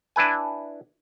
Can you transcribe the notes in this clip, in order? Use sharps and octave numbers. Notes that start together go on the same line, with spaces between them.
D4 E4 B4 G#5